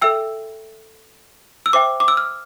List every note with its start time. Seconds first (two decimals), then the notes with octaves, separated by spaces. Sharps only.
0.02 A4 E5 G5 E6
1.66 E6
1.73 C5 E5 G5 D6
2.00 D6
2.08 E6
2.17 F6